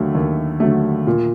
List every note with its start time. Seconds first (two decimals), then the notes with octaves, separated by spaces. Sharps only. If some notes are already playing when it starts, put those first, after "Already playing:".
Already playing: D#2 D3 F#3 A3
0.15 D#2
0.60 D3 F#3 A3
1.07 A#2